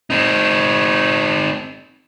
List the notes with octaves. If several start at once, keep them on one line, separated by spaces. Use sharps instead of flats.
C4 D#4